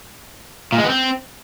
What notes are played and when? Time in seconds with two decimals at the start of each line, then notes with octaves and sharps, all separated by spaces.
0.72 A#2
0.78 G#3
0.84 B3
0.89 C4